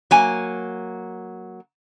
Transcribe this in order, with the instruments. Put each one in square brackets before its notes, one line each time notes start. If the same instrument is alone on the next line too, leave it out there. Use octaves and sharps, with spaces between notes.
[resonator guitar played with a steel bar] F#3 A#3 G#5